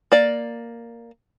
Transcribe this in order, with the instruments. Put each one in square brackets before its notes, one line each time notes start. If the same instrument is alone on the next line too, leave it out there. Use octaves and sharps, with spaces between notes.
[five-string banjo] A#3 D5